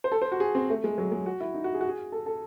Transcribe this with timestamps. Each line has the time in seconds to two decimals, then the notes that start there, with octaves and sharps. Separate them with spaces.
0.04 C5
0.12 A4
0.22 C5
0.32 F#4
0.40 G#4
0.55 C4
0.70 A3
0.84 G#3
0.98 F#3
1.12 G#3
1.26 F#4
1.40 E4
1.54 D#4
1.64 F#4
1.74 G#4
1.81 F#4
1.89 G#4
2.12 A4
2.26 A4